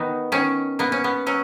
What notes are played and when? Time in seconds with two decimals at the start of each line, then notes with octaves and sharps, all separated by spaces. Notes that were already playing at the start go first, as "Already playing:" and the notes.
Already playing: D#3 B3 D#4
0.32 D#3 C#4
0.79 A#3 B3
0.92 C#4
1.04 B3
1.26 F#3 C#4